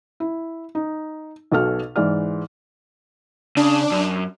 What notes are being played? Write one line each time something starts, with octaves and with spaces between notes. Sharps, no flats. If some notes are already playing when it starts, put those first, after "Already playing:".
E4
D#4
B1 B2 A4 F6
G#2 E3 D5 F6
C#3 D4
F#2